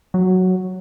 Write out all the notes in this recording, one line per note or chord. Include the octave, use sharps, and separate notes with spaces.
F#3